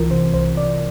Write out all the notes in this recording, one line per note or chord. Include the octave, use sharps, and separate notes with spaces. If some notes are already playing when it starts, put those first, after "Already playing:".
Already playing: C2 E3 F4 A#4
C3 C5
C2 C5
C2 D5